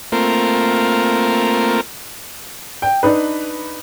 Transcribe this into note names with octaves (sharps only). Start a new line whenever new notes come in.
A3 A#3 C4 F4 A#4
G5
D4 D#4 B4